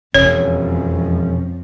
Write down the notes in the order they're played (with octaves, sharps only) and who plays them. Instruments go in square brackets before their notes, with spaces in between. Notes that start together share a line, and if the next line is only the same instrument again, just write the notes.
[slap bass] E1 [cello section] F2 F3 [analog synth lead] C#4 [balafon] C#5